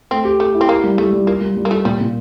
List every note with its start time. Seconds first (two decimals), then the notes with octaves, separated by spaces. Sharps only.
0.11 A3 C4
0.25 G4
0.40 A3 G4
0.54 E4
0.61 C4
0.68 A#3 G4
0.84 G3
0.98 G3 A3
1.13 G3
1.27 A#3 F4
1.41 G3
1.57 G3
1.65 A#3
1.71 A3 F4
1.85 A#2 G3
2.00 A#2